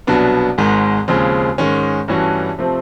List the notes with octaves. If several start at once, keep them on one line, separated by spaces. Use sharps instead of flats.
C2 B2 F#3 B3 D4
G#1 G#2 D#3 G#3
D#2 C#3 F3 G#3 C4
G#2 D#3 G#3 C#4
G2 E3 A3 C#4 F#4
C3 F3 A3 C4